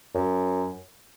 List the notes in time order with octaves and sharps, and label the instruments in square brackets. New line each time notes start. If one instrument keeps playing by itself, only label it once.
[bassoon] F#2